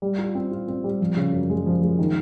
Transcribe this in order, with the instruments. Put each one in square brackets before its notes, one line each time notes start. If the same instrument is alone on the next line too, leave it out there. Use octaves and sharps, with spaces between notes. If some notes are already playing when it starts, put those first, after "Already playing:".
[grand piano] G3
F4
C4
F4
C4
G3
F3
C#3
F#2
G#3
F3
G#3
D#3